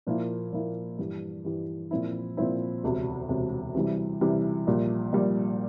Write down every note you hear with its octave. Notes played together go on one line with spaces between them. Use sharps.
A#2 F3 A#3 E4
A#2 F3 A#3 E4
G2 E3 G3
G2 E3 G3
A#2 F3 C4 E4
A#2 F3 C4 E4
E1 D2 C3
E1 D2 C3
C3 E3 G3
C3 E3 G3
A#1 A#2 G3
A#1 A#2 G3